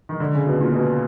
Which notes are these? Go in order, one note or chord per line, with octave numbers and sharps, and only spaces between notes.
D#3
D3
C#3
B2
A#2
B2